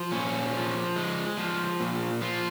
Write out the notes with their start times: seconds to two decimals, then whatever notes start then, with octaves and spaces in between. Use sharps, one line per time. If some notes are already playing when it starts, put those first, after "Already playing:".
Already playing: F3
0.12 A#2 C#4
0.53 F3
0.96 G#3
1.38 F3
1.80 A#2
2.22 F3 F4